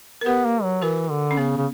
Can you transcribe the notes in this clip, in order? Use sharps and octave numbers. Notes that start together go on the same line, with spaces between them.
A#4
B3 G4 B4
A#3
F#3
E3 F#4 A#4
D3
C#4
C#3 B3
C#3